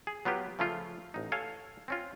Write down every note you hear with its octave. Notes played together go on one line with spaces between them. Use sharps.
G#4
F#3 B3 F4 G4 B4
C#3 F3 A3 C#4 F4
A1 D#4
A4 C#5 F5 G#5
C4 C#4 F4